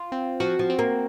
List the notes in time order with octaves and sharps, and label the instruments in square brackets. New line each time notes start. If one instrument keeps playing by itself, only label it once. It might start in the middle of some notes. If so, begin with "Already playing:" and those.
Already playing: [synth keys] F4
C4
[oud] F3 [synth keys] F#4
[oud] F3
[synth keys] C4
[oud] A#3